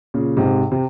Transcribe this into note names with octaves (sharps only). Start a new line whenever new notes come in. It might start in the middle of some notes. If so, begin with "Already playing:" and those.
A#2 C#3
G#2 C3
C3